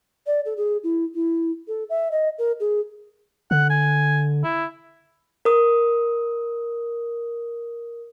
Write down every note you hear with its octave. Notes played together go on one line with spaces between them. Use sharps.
D5
A4
G#4
E4
E4
A4
E5
D#5
A#4
G#4
D3 F#5
G#5
E4
A#4 D#6